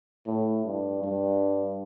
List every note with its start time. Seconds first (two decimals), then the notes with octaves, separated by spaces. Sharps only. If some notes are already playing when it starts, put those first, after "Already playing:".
0.26 A2
0.65 G2
1.03 G2